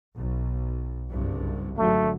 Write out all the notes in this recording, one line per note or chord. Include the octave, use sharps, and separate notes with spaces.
B1
F#1 C2 G2
G#1 D3 F#3 A3